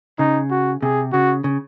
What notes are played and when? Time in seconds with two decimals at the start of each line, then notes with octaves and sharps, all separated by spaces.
0.19 C#3 D#4
0.51 F#4
0.82 C3 G#4
1.13 C#3 F#4
1.44 C#3